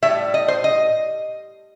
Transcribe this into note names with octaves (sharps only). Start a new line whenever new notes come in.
A2 G3 E5
D#5
C5
D#5